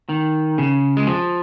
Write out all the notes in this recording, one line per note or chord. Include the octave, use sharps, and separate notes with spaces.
D#3
C#3
G#3
F3